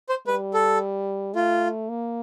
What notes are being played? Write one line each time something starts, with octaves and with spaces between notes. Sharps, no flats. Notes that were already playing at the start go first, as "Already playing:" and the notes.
C5
G3 B4
A4
A3 F4
A#3